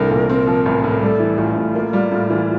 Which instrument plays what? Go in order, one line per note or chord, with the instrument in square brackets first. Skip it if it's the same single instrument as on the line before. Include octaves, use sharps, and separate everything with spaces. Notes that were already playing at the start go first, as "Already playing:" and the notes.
Already playing: [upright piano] C2 E3 A3 D4 [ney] A#4
[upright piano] A#2
C4
F3
A1
A2
[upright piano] G3 [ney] A4 A#4
[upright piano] E3
[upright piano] A1 [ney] F4
[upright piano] A2
A#3
G3
A2
E3